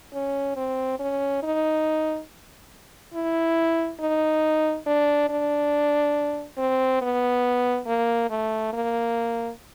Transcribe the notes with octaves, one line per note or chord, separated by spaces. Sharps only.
C#4
C4
C#4
D#4
E4
D#4
D4
D4
C4
B3
A#3
A3
A#3